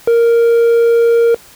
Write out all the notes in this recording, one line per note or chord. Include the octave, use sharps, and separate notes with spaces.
A#4